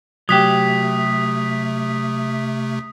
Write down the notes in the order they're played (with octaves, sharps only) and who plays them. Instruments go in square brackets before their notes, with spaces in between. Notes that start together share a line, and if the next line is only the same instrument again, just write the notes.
[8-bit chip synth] C3 A3 [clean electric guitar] F#3 G4 [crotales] D#6 B6